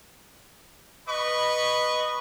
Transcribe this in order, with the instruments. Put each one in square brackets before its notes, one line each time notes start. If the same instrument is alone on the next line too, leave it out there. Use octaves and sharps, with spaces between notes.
[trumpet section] B4 D#5 B5 C#6